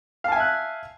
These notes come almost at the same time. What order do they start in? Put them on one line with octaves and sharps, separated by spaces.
F5 A5 G#5 E5 F#6